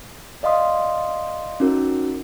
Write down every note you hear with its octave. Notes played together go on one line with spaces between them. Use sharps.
D5 D#5 F5 C6 D#6
C#4 D#4 F#4 A#4